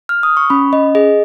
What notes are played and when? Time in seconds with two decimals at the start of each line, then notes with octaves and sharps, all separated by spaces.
0.09 F6
0.23 D#6
0.37 C#6
0.50 C#4 B5
0.73 C#4 D#5
0.95 G#4 D#5